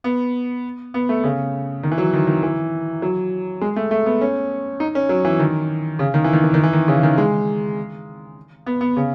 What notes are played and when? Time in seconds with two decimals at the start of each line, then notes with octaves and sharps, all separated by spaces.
0.04 B3
0.94 B3
1.09 A3
1.24 C#3
1.83 D#3
1.91 E3
1.98 F#3
2.13 D#3
2.27 D#3
2.43 E3
3.02 F#3
3.61 G#3
3.76 A3
3.91 A3
4.06 B3
4.21 C#4
4.80 D#4
4.95 C#4
5.09 F#3
5.25 E3
5.39 D#3
5.99 C#3
6.14 D#3
6.24 E3
6.33 D#3
6.44 E3
6.54 D#3
6.63 E3
6.73 D#3
6.88 C#3
7.03 D#3
7.18 G#3
8.66 B3
8.81 B3
8.97 C#3